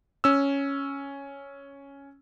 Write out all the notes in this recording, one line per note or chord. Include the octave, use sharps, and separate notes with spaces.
C#4 E6